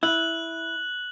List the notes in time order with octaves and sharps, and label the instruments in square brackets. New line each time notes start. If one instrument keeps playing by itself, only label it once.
[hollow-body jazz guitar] E4 [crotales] F#6 F#7